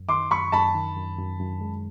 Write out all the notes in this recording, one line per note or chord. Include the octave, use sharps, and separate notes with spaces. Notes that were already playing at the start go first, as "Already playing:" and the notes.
Already playing: F#2
D#3 C6 D6
F#2 B5 C#6
F#2 A5 B5
D#3
F#2
F#2
F#2
G#3